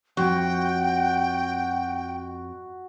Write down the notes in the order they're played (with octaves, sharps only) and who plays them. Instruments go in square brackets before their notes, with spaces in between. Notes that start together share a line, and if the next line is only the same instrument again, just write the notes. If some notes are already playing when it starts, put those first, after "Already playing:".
[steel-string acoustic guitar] F2 [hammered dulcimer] F#4 [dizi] G5